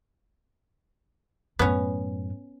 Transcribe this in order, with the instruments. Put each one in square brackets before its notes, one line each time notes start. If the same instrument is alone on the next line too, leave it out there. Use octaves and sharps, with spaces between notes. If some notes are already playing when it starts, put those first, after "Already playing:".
[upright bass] F#2 A2 [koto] B3 C#4